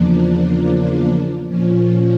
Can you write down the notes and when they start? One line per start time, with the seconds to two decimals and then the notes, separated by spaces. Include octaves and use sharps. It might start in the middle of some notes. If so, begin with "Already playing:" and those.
Already playing: E2 C#3 F3 A#3 D4
1.47 A#2 F3 C#4